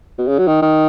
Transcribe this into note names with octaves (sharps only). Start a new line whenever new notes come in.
B2
C#3
F#3
D#3
D#3